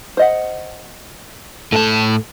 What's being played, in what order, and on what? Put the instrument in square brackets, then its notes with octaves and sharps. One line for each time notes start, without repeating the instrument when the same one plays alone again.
[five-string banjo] C5 D#5 F#5
[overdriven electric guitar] A2 A5 [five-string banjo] A3 A4